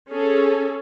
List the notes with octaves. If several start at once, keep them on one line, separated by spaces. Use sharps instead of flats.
C#4 G#4 A4